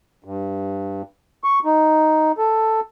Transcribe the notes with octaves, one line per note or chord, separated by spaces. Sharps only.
G2
C#6
D#4
A4